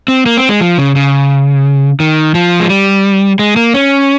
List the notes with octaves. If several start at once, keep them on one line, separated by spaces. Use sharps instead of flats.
C4
A#3
C4
G#3
F3
C#3
C#3
D#3
F3
G#3
G3
G#3
A#3
C#4